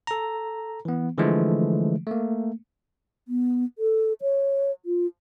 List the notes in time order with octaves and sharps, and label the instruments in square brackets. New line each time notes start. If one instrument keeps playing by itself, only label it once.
[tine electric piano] A4 A#5
E3 B3
D3 E3 F3 G#3 A3
A3 A#3
[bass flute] B3
A4
C#5
F4